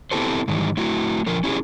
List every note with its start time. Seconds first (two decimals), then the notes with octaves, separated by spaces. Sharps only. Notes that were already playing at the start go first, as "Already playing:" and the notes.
0.11 B3 C4 E4 G4 A4 C5
0.48 G#2 D#3 E3 G3
0.77 A3 E4 F#4
1.26 D3 F3 A#4
1.44 C#4 E4 G4 G#4